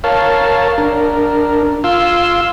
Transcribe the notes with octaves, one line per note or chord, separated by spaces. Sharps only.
A#4 C#5 F5 A5
D4 A#4
F4 F5 C6 E6